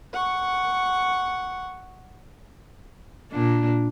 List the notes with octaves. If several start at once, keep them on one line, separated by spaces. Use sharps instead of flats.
F#5 C#6
A#2 D4